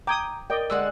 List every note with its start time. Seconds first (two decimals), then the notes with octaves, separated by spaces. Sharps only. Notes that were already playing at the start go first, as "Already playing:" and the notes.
0.07 G5 A#5 D6 D#6 G#6
0.50 A#4 D5 D#5 G5
0.70 D3 G#3 F#5 E6